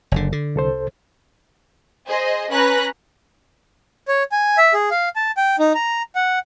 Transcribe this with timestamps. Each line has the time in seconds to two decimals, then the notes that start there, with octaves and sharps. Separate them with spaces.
0.12 F#1 D3
0.32 D3
0.56 C2 A4 C5
2.07 G#4 C5 D#5
2.51 C#4 B4 A#5 F#6
4.08 C#5
4.32 G#5
4.58 E5
4.74 G#4
4.91 F5
5.16 A5
5.37 G5
5.59 D#4
5.75 A#5
6.15 F#5